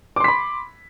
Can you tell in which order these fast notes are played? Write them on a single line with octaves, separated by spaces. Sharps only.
D6 C6 B6 B5